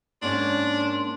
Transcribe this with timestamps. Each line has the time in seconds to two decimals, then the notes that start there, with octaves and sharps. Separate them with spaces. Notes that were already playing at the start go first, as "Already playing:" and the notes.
0.22 G#2 A#3 C#4 D4 C6